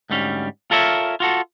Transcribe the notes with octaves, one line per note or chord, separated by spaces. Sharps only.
D2 G#2 G3 C#4
F4 A4 A#4 C#5 E5
F4 F#4 A4